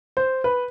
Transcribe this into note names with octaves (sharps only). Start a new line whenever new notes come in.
C5
B4